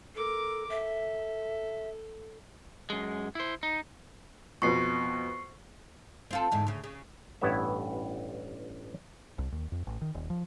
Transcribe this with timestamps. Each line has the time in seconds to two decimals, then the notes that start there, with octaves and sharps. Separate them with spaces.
0.15 A4 A#4 D6
0.70 A4 E5
2.90 F#2 G#3
3.35 E4 C5
3.63 D#4
4.62 F2 B2 C#6 C7
6.31 C4 F4 A4
6.51 E2 G#2 D3
6.67 D2 C#3
6.84 C#3
7.41 A1 G2 B3 E4 C#5 E5
9.38 C2
9.52 D#2
9.72 F2
9.87 A1
10.01 D#3
10.15 D#1
10.30 F3